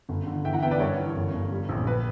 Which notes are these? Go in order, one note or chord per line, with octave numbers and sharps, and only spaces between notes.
G1
D3
E3 E5 G5
F#5 A#5
B3 E5 G5
B4 D5
G2 A#4 C#5
E3
G1
G1
G3
A#1
B4